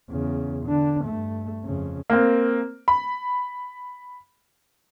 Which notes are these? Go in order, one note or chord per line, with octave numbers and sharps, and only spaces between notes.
E2 C#3
D3 D4
G2 A3
F2 C#3
A#3 C4
B5